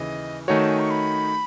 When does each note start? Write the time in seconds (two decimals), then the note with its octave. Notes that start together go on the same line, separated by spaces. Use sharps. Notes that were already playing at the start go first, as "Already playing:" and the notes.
Already playing: D#2 C#3 E3 D#5
0.48 D#3 A3 D#4 F#4 C#5 G#5
0.58 A5
0.69 G#5
0.80 C#6
0.90 B5